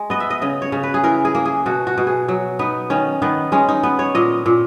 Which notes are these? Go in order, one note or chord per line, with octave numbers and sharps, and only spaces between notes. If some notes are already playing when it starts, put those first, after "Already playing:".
Already playing: G#3
B3 D#5
E5
D#5
C#3 D#5
C#5
C#3
B4
G#4
E3 A#4
G#4
A#3
G#4
B2 F#4
F#4
B2
G#4
F#3
B3 D#4
D#3 C#4
D#3 B3
G#3 C#4
D#4
B3
C#5
A#2 D#5
A#2